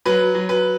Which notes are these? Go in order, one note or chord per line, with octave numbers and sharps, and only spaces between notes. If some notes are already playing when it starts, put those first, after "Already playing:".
F#3 B4
F#3
B4